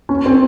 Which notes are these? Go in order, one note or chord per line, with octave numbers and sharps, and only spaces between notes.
C#4
C4